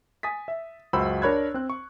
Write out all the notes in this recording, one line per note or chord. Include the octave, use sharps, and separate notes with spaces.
G#5 D#6 A6 B6
E5
C#2 F#2 F#4 C5 B5 E6
D4 A#4 C#5 B5 F#6 G#6
C4 F#6
C#6